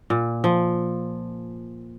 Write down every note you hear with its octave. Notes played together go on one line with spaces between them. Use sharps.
A#2
F3